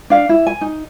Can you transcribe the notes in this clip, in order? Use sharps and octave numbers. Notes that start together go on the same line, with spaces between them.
D4 F5
E4
G#5
D#4